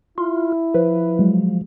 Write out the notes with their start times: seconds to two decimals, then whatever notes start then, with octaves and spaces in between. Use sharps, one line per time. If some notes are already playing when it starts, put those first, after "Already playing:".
0.18 E4 F4
0.74 F3 B4
1.19 F#3 G#3